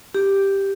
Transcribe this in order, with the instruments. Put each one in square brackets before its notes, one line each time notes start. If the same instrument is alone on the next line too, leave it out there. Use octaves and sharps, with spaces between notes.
[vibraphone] G4